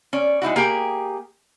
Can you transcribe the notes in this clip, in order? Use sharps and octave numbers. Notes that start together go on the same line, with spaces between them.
C#4 D5
G#3 D#4 E4 F#4
A#3 G4 G#4 G5